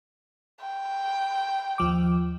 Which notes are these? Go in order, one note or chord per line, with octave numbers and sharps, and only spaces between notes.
G5
D#2 F3 D6